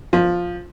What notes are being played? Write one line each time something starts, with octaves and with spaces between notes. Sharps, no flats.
F3